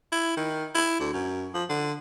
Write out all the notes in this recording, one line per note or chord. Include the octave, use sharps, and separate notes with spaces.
E4
D#3
E4
D2
F#2
F3
D3